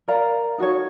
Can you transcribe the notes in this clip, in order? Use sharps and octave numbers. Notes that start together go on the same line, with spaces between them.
A#4 D5 F5 A#5
D#4 F#4 A4 C#5